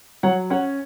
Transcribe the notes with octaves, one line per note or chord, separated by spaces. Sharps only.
F#3 C#5 F#5
C#4 C#5 F#5